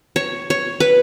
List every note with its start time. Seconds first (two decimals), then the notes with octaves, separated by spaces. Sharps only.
0.16 C#5
0.50 C#5
0.80 B4